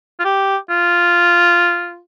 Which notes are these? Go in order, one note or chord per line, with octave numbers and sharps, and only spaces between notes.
F4
G4
F4